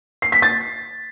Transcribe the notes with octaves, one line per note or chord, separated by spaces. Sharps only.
C7
B6
A6